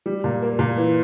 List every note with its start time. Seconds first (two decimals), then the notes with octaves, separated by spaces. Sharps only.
0.06 G3
0.24 A#2
0.42 A#3
0.59 A#2
0.77 E3